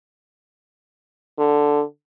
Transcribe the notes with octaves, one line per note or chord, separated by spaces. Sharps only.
D3